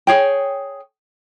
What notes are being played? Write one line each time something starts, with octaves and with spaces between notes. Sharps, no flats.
G#4 C#5 G5